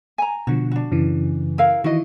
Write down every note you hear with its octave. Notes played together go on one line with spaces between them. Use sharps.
G#5 A#5
B2 D3 F3 F#4
D4 F#4
F#2 C#3 E3
E4 A#4 F5
D#3 E3 E4 F#4 D#5